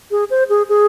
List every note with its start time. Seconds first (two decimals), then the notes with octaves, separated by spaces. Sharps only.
0.11 G#4
0.30 C5
0.49 G#4
0.69 G#4